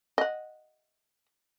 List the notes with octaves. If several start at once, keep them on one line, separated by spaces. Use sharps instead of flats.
D#5 F#5